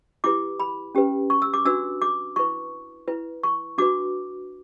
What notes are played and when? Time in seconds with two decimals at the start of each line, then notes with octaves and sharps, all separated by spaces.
0.24 E4 G4 B4 D6
0.60 B5
0.95 C#4 G4 B4
1.30 C#6
1.42 E6
1.54 D6
1.65 D4 F#4 B4 E6
2.02 D6
2.36 E4 B4 C#6
3.08 E4 B4
3.43 C#6
3.78 D4 F#4 B4 D6